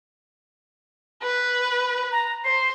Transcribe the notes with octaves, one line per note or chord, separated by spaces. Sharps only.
B4
A#5
C5 C7